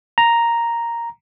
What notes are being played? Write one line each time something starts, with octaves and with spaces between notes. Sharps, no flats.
A#5